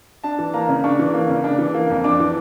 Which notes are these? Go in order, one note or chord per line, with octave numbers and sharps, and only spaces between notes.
D4 A5
E3
A#3 A#5
C#3
D4 C#6
E3
A#3
C#3
D4
E3
A#3
F2
D4 D6
E3